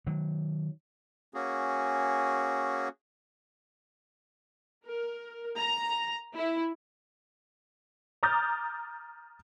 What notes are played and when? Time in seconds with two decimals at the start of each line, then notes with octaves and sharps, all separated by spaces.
0.07 D#3 F#3
1.34 A#3 C#4 F#4 G#4
4.85 A#4
5.59 A#5
6.34 E4
8.23 A#5 D6 D#6 F6 G6 A6